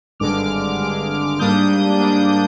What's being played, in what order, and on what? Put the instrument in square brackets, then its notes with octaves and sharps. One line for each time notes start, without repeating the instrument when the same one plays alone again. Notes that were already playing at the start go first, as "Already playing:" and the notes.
[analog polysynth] G#1 G2 D3 G#3 D6 F6
G#1 G2 D3 G#3
G#2 G3 A#3 D4 D#6 G6
G#2 G3 A#3 D4